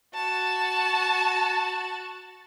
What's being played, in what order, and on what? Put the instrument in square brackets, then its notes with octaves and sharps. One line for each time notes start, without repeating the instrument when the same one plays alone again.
[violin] F#4 A5